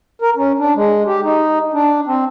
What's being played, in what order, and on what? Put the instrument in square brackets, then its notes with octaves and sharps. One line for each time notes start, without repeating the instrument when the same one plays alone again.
[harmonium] A#4
C#4
D4
G#3
G4
D#4
D4
C4